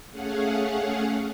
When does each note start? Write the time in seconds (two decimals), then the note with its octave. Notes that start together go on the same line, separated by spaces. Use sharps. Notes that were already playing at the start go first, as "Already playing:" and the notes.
0.10 A3 C#4 G#4 F5 F#5